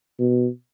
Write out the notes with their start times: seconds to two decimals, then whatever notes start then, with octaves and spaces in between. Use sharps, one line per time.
0.19 B2